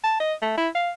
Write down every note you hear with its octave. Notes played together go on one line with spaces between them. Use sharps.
A5
D#5
A3
E4
F5